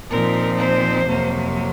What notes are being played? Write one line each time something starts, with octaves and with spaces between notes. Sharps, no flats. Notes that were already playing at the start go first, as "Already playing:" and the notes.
A#2 F3 C4 D#4 A#4
C5
F2 C3 F#3 A#3